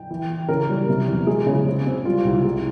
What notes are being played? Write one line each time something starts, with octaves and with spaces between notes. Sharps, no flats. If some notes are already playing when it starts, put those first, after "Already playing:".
Already playing: G5
E3
E3
C#3 A#4
G3
C3
E2
G#3 G#4
C#3
C4
C4
G3 F4
C2
G#3